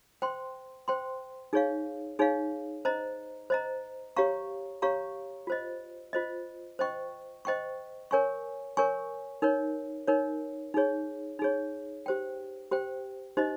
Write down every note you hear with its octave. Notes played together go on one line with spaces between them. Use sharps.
C5 G5 C6
C5 G5 C6
D#4 G#4 C#5 F5
D#4 G#4 C#5 F5
C5 D#5 A#5
C5 D#5 A#5
G4 C#5 F5 A#5 C#6
G4 C#5 F5 A#5 C#6
F4 C5 D#5
F4 C5 D#5
C5 D#5 G5 C#6
C5 D#5 G5 C#6
A#4 C#5 G#5 C#6
A#4 C#5 G#5 C#6
D#4 A#4 C#5
D#4 A#4 C#5
D#4 G#4 C#5
D#4 G#4 C#5
G4 C5 G5
G4 C5 G5
D#4 G4 C5 D#5